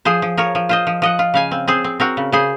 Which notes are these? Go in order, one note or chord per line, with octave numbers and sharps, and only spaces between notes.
F3 G#4 C5
F3
F3 A#4 C#5
F3
F4 C5 D#5
F3
F3 D#5 F#5
F4
C#3 F5 G#5
C4
C4 G#4 C5
C4
C4 F#4 A#4
C#3
C#3 G#4 C5